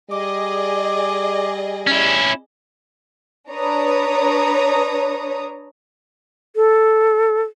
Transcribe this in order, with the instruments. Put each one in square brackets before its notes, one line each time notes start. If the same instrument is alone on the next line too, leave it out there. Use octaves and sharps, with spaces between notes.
[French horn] G3 [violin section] G#4 D5 D#5 [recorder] D6
[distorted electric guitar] C#4 E4
[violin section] D4 B4 C#5 A#5 D#6
[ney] A4